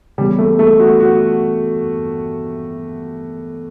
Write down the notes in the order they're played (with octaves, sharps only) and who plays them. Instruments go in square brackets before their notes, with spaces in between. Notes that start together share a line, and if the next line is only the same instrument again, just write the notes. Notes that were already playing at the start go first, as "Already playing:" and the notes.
[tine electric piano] C#3 E3 B3 [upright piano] G3
[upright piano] A3
A3
F#4
F#4